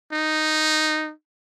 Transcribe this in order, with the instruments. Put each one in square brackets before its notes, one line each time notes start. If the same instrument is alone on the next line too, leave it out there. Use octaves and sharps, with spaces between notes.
[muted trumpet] D#4